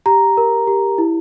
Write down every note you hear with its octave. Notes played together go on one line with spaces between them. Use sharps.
G4 A#5
A#4
G4
E4